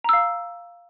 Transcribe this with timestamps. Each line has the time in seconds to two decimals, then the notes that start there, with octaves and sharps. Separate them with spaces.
0.04 A#5
0.09 E6
0.13 F5